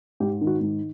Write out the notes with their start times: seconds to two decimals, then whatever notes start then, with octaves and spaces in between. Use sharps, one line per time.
0.20 G#2 G4
0.41 D#3
0.47 F#4
0.61 G#2